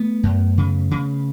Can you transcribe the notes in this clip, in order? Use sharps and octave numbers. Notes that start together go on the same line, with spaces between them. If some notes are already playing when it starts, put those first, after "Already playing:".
Already playing: A3 B3
F#2
C#3
C#3